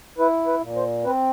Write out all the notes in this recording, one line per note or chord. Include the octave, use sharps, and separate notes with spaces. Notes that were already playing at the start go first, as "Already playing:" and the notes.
E4 B4
B4
A#2
C5
C4 B4